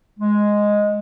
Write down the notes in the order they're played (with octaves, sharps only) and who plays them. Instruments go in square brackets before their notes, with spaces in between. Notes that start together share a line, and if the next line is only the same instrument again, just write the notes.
[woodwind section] G#3